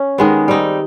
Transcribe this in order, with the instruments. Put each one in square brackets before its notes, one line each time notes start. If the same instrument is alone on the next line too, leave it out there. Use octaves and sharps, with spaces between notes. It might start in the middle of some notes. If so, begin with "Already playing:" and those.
Already playing: [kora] C#4
D#3 G#3 B3
G3 C4 D#4